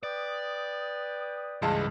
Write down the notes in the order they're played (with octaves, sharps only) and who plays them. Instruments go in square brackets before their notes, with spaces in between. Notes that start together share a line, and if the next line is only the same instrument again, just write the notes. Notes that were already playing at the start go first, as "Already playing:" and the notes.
[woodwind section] B4 G5 D#6 [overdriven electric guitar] D5
[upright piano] C#2 G#3 A5 [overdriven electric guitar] G2 E3